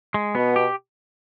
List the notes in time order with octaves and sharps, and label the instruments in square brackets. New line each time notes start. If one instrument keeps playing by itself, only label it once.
[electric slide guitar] G#3
[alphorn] B2 [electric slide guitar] B3
[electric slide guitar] G4